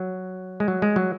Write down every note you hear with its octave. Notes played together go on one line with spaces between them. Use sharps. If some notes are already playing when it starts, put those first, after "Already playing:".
Already playing: F#3
G#3
F#3
G#3
F#3